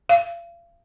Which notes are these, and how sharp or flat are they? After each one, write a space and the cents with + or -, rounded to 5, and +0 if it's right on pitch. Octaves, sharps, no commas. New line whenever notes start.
F5 -35